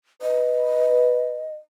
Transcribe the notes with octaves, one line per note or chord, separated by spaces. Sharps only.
B4 D#5